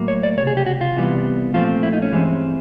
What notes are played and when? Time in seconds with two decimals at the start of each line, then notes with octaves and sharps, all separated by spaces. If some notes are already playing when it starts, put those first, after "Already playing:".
Already playing: A2 F#3 A#3
0.08 C#5
0.23 D5
0.37 C#2 C3 C#5
0.47 G#4
0.57 G4
0.66 F#4
0.81 F4
0.95 C2 C3 E3 G3 B3
1.54 A#2 F3 A3 C4 F4
1.83 E4
1.93 D#4
2.02 C#4
2.12 G2 E3 G#3 C4